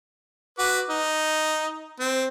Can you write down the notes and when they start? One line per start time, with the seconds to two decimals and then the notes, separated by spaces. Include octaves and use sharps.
0.59 F#4 B4 D6
0.89 D#4
2.00 C4